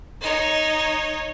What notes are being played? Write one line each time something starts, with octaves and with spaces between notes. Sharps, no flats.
D#4 C#5